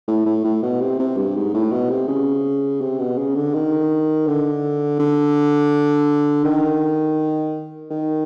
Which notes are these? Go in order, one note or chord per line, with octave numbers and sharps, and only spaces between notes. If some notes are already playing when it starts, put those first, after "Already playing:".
A2
A2
A2
B2
C3
C3
G2
G#2
A2
B2
C3
C#3
C3
B2
C#3
D3
D#3
D3
D3
D#3
D#3